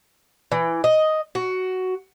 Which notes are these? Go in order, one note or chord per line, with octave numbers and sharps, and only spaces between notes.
E3
D#5
F#4